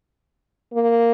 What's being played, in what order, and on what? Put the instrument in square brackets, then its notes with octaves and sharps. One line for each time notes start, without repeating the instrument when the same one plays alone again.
[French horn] A#3